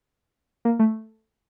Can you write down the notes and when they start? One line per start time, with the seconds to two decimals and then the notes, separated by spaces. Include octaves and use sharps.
0.65 A#3
0.79 A3